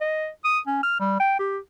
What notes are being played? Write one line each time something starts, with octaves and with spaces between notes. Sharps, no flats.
D#5
D#6
C#4
F6
G3
G5
G4